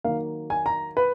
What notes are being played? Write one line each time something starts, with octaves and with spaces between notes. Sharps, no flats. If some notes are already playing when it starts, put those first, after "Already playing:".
D#3 F#3 A#3 F5
G#5
A#5
B4